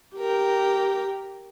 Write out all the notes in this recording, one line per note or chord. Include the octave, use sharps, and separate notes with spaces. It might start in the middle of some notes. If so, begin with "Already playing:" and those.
G4 A#4 G5